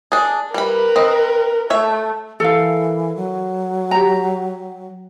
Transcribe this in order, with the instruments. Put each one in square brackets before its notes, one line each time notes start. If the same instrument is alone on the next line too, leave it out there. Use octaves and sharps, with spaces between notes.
[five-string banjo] D4 G#4
[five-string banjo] G3 B5 [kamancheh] A#4 B4
[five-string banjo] C4 D#5
[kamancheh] A3 [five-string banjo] C#5 E5
[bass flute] E3 [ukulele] A4 A#4 F5
[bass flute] F#3
[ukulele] G4 A#5